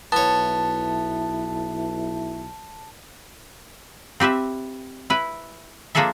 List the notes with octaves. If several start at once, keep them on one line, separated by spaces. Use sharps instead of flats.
B1 B3 E4 C#5 A5
C4 G4 B4 E5
E4 B4
F3 A#3 D4 G#4 A4 E5